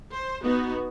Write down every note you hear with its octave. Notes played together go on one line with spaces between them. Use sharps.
C5
B3 D#4 F#4